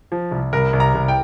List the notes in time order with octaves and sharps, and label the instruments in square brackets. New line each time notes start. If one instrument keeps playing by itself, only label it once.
[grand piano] F3
C2
[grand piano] C2 [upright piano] A#4
[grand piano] C2
[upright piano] A#5
[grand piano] C2
[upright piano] G5